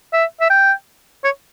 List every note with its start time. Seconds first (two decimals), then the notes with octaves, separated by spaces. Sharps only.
0.13 E5
0.41 E5
0.50 G5
1.24 C#5